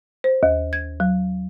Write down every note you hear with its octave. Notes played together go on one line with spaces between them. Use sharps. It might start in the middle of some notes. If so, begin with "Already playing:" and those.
C5
D#2
G#6
F#3